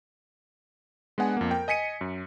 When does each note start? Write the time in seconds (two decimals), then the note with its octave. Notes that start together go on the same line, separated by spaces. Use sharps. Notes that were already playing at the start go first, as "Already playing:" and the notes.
1.18 G#3 B3 D4 F#5 G#5
1.37 F2 A#3
1.51 A#4 G5
1.68 D#5 G#5 B6 C#7 D#7
2.01 F#2